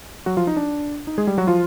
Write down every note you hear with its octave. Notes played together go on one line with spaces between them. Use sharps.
F#3 F#4
F3 F4
D#4
D4
D#4
G#3 G#4
G3 G4
F#3 F#4
F3 F4